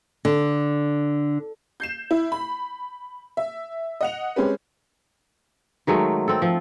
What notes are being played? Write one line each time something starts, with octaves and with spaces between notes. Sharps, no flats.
D3
G6 C7 E7
E4
B5
E5
D#5 F#5 F7
G#3 C4 C#4 G4 B4
D#3 F#3 G#3 A3
C4 A4
F3